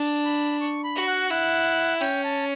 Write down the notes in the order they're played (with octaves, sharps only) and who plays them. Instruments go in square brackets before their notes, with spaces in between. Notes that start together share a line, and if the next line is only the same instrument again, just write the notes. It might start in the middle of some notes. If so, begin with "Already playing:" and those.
Already playing: [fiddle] D4
[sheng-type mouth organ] B5
C#6
B5
[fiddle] F#4
[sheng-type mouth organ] F#5
[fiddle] E4 [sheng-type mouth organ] F#5
[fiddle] C#4 [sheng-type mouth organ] G5
[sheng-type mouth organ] A5